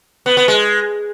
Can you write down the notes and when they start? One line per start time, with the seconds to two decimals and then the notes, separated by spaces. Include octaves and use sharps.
0.26 B3
0.37 B3
0.48 G#3